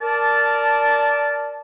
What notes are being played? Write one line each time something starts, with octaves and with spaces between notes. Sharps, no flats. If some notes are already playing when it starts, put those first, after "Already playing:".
A#4 D5 A5